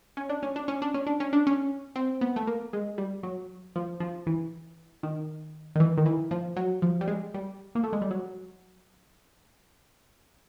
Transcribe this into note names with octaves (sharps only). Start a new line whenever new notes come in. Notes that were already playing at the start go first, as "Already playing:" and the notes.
C#4
D4
C#4
D4
C#4
D4
C#4
D4
C#4
D4
C#4
C4
B3
A3
A#3
G#3
G3
F#3
F3
F3
E3
D#3
D#3
E3
D#3
E3
F3
F#3
F3
G3
G#3
G3
A#3
A3
G#3
G3
F#3